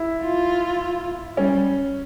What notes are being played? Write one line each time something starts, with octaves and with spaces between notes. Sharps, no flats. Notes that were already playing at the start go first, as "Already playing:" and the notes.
Already playing: E4
F4
G3 C#4